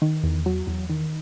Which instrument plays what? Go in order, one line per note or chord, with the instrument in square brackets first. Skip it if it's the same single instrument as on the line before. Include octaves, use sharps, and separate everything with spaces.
[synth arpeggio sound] D#3
E2
F#3
E2
D#3